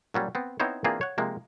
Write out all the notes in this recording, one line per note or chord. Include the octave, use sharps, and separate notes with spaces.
A#2 F#3 G3 C#4
B3 C4
B3 C4 D#4 E4 C5 C#5
E3 A#3 C4 D4 F4 G#4
C#5 F#5
C3 F3 G#3 A#3